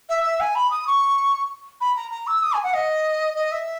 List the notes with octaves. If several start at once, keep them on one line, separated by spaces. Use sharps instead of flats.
E5
E5
G#5
B5
D#6
C#6
B5
A#5
A#5
E6
D#6
G#5
F#5
D#5
D#5
E5